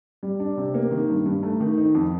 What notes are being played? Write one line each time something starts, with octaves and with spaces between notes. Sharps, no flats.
G3
D4
C3
A#3
D#3
G2
G2
A3
D#3
D#4
F2